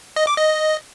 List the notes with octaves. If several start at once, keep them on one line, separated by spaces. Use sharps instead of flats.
D#5
D6
D#5